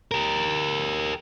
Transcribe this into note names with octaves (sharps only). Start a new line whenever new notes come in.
G4 A#4